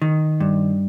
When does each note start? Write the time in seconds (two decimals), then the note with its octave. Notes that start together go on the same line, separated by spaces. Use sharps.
0.02 D#3
0.40 G2